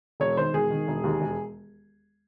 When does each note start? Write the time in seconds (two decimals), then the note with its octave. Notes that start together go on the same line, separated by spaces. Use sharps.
0.20 E1 C#5
0.37 D#3 C5
0.54 E1 G#4
0.70 D#3
0.88 E1
1.04 D#2
1.21 E1